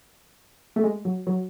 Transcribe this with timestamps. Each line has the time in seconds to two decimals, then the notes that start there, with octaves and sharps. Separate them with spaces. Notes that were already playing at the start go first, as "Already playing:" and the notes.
0.76 A3
0.84 G#3
1.05 F#3
1.27 F#3